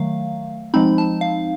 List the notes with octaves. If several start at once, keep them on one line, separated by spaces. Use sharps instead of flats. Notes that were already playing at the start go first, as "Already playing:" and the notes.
Already playing: D#3 F#3 A3 F5
F3 G#3 C4 D#4 B5
A5
F5